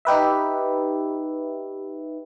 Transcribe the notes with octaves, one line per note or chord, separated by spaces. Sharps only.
D#4 G4 B4 E5